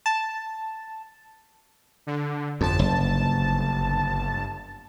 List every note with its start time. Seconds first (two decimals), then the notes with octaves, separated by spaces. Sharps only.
0.06 A5
2.07 D3
2.61 G1 F2 A5
2.79 F#1